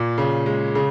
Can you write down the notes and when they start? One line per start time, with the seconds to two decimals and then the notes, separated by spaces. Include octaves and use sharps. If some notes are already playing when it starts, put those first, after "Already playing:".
Already playing: A#2
0.18 C#3
0.46 G#3
0.75 C#3